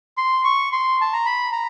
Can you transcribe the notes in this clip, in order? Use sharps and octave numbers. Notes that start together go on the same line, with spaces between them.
C6
C#6
C6
A5
A#5
B5
A#5